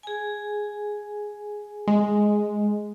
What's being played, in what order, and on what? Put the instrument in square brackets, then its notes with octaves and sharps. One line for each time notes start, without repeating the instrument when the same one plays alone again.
[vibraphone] G#4 G#5
[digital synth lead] G#3